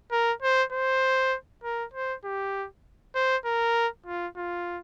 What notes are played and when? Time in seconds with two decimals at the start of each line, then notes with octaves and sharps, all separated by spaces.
0.11 A#4
0.42 C5
0.72 C5
1.64 A#4
1.94 C5
2.24 G4
3.15 C5
3.45 A#4
4.06 F4
4.36 F4